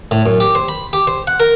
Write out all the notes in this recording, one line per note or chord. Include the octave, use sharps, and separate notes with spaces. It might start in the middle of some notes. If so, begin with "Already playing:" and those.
A2
F#2
G4
C5
B5
G4
C5
F#5
A#4